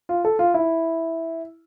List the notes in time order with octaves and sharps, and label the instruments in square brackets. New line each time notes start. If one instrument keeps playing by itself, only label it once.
[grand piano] F4
A4
F4
E4